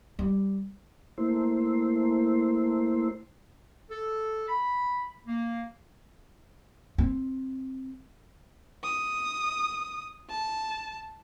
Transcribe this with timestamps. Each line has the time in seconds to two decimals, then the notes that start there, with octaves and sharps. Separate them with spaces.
0.19 G3
1.18 A3 A#3 E4 C5
3.90 A4
4.48 B5
5.26 A#3
6.98 C4
8.84 D#6
10.29 A5